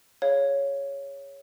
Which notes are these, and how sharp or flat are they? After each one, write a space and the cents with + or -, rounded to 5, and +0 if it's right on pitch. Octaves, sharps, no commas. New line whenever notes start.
G#4 +0 C#5 +0 F5 -5